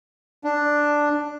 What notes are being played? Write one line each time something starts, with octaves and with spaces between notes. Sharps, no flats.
D4